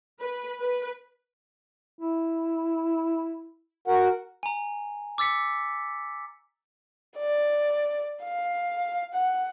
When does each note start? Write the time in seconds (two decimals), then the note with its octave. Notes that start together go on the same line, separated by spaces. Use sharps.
0.21 B4
0.61 B4
1.99 E4
3.88 F#4 A#4 F#5
4.43 G#5 A#5
5.18 D6 E6 A6 B6 C#7
7.17 D5
8.23 F5
9.14 F#5